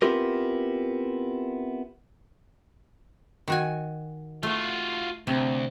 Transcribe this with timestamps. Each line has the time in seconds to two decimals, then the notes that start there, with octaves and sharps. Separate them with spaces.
0.02 B3 C4 E4 F4 G4 A#4
3.48 D#3 F#4 G#5
4.43 A3 F4 F#4
5.27 D2 C3